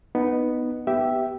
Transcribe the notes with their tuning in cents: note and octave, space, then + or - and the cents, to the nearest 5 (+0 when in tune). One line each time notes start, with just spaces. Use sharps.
B3 +0 D#4 -20
B3 +0 G4 -10 E5 +0